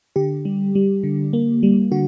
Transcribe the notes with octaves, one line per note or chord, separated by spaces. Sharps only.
D3 G4
G3
G3
D3
A#3
G3
D3 F#4